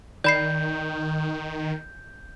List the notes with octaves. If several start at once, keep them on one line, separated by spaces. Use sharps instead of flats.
D#3 D5 B5 G6 C7